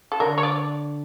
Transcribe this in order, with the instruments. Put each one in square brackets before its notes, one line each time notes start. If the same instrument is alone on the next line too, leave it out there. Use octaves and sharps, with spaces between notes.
[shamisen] A4
[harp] D3 [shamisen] A#4
[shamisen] C#5
D5